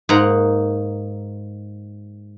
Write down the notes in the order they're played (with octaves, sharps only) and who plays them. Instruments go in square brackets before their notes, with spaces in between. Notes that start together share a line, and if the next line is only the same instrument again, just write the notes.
[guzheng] G#2 A#3 F#5 A#5